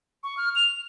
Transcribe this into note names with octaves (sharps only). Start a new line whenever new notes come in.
C#6
F6
F7